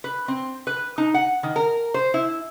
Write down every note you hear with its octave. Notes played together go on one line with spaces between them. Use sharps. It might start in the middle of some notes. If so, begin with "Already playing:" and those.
B4
C4
B4
D#4
F#5
D#3
A#4
C5
E4